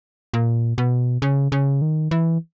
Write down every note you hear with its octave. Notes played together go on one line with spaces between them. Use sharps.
A#2
B2
C#3
C#3
D#3
E3